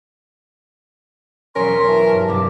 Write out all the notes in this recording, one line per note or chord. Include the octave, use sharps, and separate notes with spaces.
E1 F#3 C#4 A#4 C6 B6
E3 A5
G2
C2 G2 D6